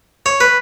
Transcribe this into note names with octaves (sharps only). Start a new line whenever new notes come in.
C#5
B4